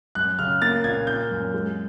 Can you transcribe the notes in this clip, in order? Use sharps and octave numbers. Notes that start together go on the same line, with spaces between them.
F#2 F#6
C#3 F6
A#3 A6
A#2 G#6
A#3 G6
F#2
G#3